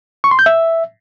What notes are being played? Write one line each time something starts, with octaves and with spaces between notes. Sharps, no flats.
C#6
C6
G6
E5